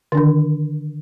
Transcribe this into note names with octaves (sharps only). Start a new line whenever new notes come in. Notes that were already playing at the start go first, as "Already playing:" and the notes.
D3 D#3 D4